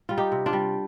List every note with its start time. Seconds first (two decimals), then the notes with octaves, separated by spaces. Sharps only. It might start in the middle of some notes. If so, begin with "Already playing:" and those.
Already playing: C5
0.09 G3 F4
0.18 D#4 G4
0.32 C3
0.46 D4 F4
0.53 G3